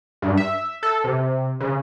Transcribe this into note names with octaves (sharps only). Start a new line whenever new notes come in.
G2
E5
A4
C3
C#3